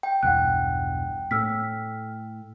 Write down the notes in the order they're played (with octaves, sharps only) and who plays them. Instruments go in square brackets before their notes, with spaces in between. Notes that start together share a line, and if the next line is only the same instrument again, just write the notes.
[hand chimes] G5
[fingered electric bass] B1 E2 G2 [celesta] F#5 F#6
[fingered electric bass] A2 [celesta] E6 F6 B6